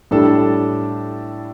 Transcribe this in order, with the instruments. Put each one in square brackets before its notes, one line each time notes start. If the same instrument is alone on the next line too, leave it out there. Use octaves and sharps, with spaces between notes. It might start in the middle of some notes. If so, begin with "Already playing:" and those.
[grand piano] A2 G3 D4 A4